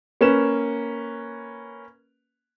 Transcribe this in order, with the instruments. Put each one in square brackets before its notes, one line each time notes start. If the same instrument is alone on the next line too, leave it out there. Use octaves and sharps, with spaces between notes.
[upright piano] A#3 C#4 B4 E7